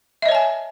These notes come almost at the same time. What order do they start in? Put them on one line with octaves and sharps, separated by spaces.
E5 D#5 C#5 A5 G#5